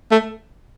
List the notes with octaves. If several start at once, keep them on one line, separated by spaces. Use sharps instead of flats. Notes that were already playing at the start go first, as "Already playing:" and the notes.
A3